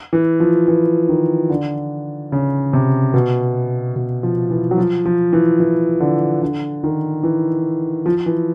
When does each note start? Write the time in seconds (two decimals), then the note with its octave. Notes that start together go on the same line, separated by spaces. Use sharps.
0.13 E3
0.40 F3
0.68 E3
1.09 D#3
1.50 D3
2.32 C#3
2.73 C3
3.14 B2
3.96 B2
4.23 F3
4.50 E3
4.71 F#3
4.78 F3
5.06 F3
5.33 E3
5.60 E3
6.00 D3
6.42 D3
6.84 D#3
7.23 E3
8.06 F3
8.26 E3